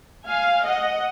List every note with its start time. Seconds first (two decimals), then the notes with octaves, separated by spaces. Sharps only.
0.25 F5 G#5
0.63 D#5 F#5